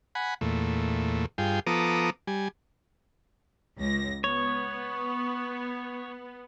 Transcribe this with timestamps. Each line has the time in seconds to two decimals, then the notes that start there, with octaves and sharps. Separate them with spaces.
0.15 F#5 G#5 B5
0.41 E2 A#2 A3
1.38 G2 F4 G#4 G5
1.67 F3 B3 A4 A#5 D6 D#6
2.27 G3 G#5
3.78 C#2 A#6
4.24 B3 C#5